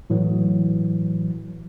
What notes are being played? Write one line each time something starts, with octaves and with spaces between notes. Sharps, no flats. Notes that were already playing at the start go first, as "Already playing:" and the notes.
A2 E3 F#3